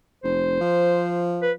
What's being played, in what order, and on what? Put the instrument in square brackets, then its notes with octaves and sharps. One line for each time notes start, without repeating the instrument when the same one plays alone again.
[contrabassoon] F1 [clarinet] C5
[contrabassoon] F3
[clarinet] B4